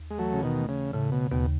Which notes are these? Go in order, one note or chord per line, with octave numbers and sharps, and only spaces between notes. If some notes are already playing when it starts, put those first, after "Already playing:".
Already playing: D#2
G#3
E3 F#3 A3
C#3
B2 D#3
A3
C#3
A2 C#3
B2
D#2 B2